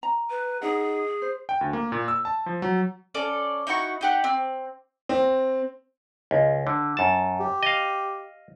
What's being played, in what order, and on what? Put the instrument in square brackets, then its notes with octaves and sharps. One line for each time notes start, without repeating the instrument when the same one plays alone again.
[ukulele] A#5
[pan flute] B4
[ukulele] D#4 D#5 F#5 [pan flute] G#4
[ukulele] C5
[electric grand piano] G5
D2
A#3
A#2
E6
A5
F3
F#3
[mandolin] C#4 A4 D5
D#4 E4 F#4 C#6
D#4 G4 F#5
C4
[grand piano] C4
[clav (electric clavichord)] C#2
D3
F#2 A5
[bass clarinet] G4
[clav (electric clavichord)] D#5 F5